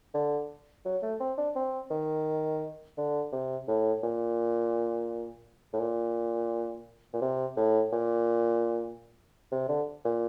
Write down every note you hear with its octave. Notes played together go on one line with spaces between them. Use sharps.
D3
F#3
A3
C4
D4
C4
D#3
D3
C3
A2
A#2
A2
A#2
A#2
C3
A2
A#2
C3
D3
A#2